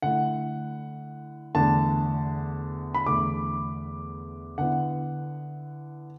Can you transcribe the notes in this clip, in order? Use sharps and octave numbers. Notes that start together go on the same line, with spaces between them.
D3 A3 E4 F#5
E2 D3 A3 A5
B5
E2 D3 A3 D6
D3 B3 E4 F#5